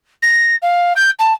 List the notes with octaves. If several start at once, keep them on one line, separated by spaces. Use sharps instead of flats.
A#6
F5
G6
A5